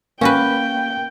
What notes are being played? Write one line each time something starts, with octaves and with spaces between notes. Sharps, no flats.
A#3 C#4 F#4 B4 G5